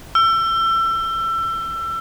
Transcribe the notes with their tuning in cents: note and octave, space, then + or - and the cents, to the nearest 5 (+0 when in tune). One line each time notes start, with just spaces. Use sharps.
E6 +30